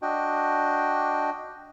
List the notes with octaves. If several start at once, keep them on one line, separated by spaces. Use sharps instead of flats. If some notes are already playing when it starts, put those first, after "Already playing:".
D4 F#4 D#5 G5